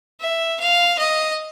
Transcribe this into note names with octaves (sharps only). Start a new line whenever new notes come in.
E5
F5
D#5